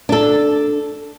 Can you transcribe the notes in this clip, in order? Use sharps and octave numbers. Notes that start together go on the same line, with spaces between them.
D4 A4